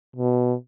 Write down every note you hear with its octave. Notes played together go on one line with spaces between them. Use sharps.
B2